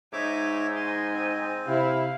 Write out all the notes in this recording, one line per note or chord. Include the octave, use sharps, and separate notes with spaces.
G#2 D#4 C#5 E5 D6
D#5 G#5 C6
C4
C3 E4 F5